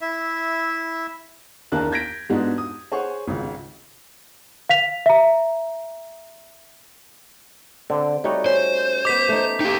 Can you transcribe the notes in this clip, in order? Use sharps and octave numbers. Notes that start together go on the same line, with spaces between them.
E4 E5
F#1 D#2 D4 A#4 A5 F#6
G6 G#6 A#6 B6 D7
G#2 G#3 B3 D4 D#4 F#4
D#6
G#4 C5 C#5 F#5 G#5 C#6
G#1 C#2
F5 B6 F7
E5 A#5
D3 C4
G3 A3 D#4 F#4 C#5 D5
C#4 C5
B3 D#5 D6 B6
A3 D#4
D#4 G4 G5